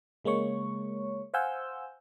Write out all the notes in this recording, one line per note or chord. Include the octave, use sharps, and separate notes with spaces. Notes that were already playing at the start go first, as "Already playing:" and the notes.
C#3 G#3 A#3 C#5 C#6
C5 F5 F#5 G#5 E6 G6